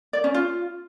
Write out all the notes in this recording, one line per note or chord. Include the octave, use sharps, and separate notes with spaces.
D5
C#4
F4